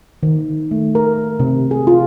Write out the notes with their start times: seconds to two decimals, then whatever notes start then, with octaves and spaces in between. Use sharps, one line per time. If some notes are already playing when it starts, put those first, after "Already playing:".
0.23 D#3
0.71 A3
0.95 A#4
1.40 C3
1.71 G#4
1.87 F4